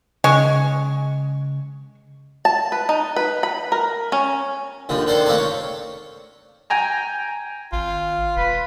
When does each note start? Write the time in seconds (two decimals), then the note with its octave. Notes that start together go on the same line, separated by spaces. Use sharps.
0.24 C#3 G#3 G#5 C#6
2.45 A5
2.72 B4
2.89 D#4
3.16 B4
3.43 B5
3.72 A#4
4.12 C#4
4.89 D#2 D3 F3
5.07 D#3 D4 A4 C5
5.26 A3 A#3 C4 D4 A4
5.38 C#5
6.70 G5 G#5 A#5
7.72 G#1 F4
8.36 E1 B4